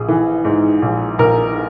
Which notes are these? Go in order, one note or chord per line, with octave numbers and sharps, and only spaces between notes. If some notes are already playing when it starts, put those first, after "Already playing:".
Already playing: A#1 G#4
E3
G#2
A#1
A#1 A#4